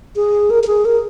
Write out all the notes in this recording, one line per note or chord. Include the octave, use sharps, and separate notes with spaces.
G#4
A#4
A#4
G#4
A#4